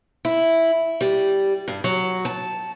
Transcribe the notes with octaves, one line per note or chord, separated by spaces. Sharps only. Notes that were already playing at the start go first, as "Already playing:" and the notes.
E4
G3
G2
F#3
A5